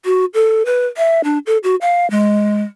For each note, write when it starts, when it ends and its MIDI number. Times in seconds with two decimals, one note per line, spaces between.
0.05 0.25 66
0.34 0.63 69
0.66 0.86 71
0.97 1.21 76
1.24 1.38 62
1.46 1.57 69
1.63 1.75 66
1.81 2.09 77
2.10 2.63 56